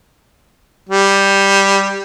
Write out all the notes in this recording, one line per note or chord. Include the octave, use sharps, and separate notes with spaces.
G3